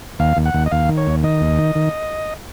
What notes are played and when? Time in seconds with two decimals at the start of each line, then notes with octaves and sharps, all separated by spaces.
0.19 D#2 F5
0.37 D#2
0.46 F#5
0.54 D#2
0.66 D#5
0.71 D#2 F5
0.89 D#3
0.97 C#5
1.06 D#2
1.24 D#3 D#5
1.41 D#2
1.58 D#3
1.75 D#3